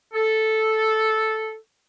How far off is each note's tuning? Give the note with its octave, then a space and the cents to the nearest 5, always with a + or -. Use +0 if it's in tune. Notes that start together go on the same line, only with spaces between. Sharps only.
A4 -5